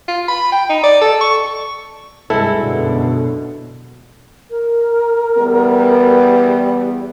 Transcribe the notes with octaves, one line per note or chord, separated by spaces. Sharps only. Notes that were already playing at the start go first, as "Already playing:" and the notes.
F4
B5
G5
D#4
D5
A4
C#6
C2 G2 G#3 E4 A4
F#2 B2 D3
A#4
E2 G3 B3